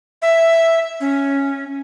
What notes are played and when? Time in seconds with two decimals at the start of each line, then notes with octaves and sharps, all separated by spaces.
0.22 E5
1.00 C#4